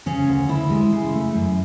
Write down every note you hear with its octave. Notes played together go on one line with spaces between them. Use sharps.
C#3 C#4
D2
D2 E4
G#3
C#3
A3
F#2